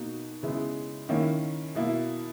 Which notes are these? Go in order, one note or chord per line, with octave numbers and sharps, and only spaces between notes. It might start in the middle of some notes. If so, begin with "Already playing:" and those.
Already playing: B2 A#3 D#4 F#4
C#3 G#3 B3 E4
D#3 A#3 C#4 E4
B2 A#3 E4